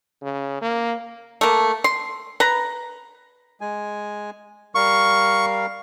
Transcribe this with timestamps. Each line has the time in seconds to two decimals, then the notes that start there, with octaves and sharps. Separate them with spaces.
0.22 C#3
0.61 A#3
1.41 A3 A#3
1.84 C6
2.40 B4 A#5
3.61 G#3 G#5
4.75 G3 A#4 F5 C#6